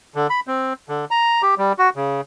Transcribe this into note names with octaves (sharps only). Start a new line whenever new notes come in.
D3
B5
C4
D3
A#5
G4
G3
F#4
C#3